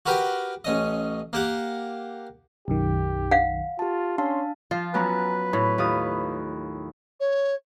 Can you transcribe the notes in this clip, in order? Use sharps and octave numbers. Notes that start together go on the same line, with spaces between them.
F#4 G4 A#4 B4 G5
A1 C#4 D#5
A#3 G4 F#5
B1 F#2 D#3 G4
F5 F#5
F4 G4 A5
C#4 D4 F5 A5 C6
F3 F4
F#3 B3 C#4 B4 G#5 A#5
A2 B5 C#6 G#6
D#2 F4 D#6
C#5